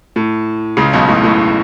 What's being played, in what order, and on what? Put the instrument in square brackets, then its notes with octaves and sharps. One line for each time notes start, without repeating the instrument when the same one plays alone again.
[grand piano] A2
C#2 C#3
B1 B2
A2
A2